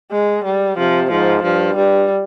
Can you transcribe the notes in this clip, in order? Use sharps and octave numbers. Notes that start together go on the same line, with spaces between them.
G#3
G3
C3 F3
G#2 F3
G2 F3
G2 G3